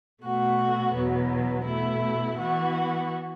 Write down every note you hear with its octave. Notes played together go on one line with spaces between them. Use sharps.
B2 A3 F#4
E2 B2 F#3 B3
B2 A3 E4
E3 B3 F#4